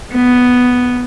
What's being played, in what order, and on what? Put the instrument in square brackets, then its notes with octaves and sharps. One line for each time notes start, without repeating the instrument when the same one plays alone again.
[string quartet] B3